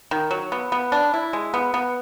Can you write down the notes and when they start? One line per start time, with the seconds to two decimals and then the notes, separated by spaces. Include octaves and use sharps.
0.11 D#3
0.31 F#3
0.52 B3
0.72 B3
0.92 D4
1.14 E4
1.33 G#3
1.54 B3
1.74 B3